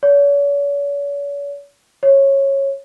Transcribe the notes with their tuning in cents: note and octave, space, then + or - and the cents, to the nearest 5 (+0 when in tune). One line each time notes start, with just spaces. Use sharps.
C#5 +45
C#5 -15